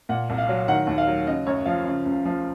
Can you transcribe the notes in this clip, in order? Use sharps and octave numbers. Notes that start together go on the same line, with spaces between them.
A#2 F#5
C2
F5
F#3
D#3 F#5
D#2
F5
F#3
C#3 D#5
F#2 C#5
F3 F5
C#3
C#2
F3